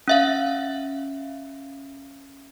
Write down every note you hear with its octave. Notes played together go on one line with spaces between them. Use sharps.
C#4 E5 F5